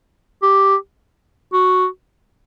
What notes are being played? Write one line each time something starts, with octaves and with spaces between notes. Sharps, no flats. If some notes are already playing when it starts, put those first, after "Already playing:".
G4
F#4